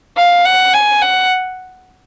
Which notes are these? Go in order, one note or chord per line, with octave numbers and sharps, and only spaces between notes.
F5
F#5
G#5
F#5